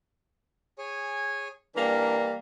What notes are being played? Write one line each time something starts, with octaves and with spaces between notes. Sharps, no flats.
G#4 C#5 G#5
E3 G3 A#3 D4 A#4